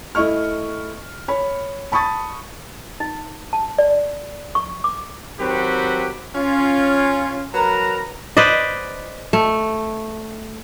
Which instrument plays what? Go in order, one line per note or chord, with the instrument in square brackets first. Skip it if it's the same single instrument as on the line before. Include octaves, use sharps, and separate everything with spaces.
[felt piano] A3 E4 D#5 C#6 F6
C#5 B5
A5 B5 C#6 D#6 A6
[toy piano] D#4
A5
D5
C#6
D6
[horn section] D#3 F#3 C4 F#4 G4 B4
C#4 F4
F#3 A#4 B4 A#5
[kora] B4 C5 D5 D#5
A3